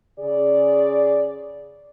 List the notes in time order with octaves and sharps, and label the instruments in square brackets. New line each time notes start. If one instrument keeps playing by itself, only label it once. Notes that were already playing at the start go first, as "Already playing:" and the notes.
[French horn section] C#3 G#4 D5